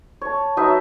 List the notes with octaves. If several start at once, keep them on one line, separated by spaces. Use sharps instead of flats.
C#5 A5
F#3 D#4 B4 E5